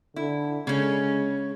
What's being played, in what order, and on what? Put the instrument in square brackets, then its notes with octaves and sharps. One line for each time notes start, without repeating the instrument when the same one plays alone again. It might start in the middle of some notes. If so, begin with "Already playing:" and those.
[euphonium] D3 [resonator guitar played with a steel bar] E4
[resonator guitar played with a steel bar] C#3 C#4 [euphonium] G#3